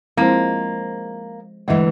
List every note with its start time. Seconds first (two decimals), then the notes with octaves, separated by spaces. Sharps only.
0.17 F3 G#3 A#3 C4 E4 C5
1.68 D2 E3 G#3 D#5 E5